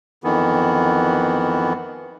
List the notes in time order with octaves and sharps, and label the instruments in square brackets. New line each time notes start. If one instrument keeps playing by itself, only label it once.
[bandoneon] F2 D#3 E3 B3